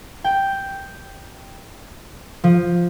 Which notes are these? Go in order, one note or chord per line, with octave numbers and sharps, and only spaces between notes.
G5
F3